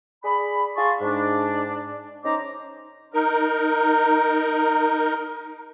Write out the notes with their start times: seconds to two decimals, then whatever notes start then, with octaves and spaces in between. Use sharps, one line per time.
0.24 G#4 D5 B5
0.78 G#4 F5 A5 C6 C#6
1.01 G#2 D4
2.25 C#4 D#4 C5 A#5 D6
3.14 D#4 A#4